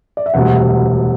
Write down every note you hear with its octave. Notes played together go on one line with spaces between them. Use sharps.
D5
E5
E1 D2 C3 G3 F#5